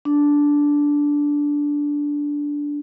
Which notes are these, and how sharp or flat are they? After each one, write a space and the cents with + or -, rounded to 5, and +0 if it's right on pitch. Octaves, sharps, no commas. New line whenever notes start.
D4 -10